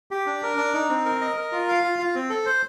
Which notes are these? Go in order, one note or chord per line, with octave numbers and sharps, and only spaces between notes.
G4
D4
A#4
D4
D#4
C4
A#4
D#5
A#4
F4
F5
F4
F4
C4
A4
C5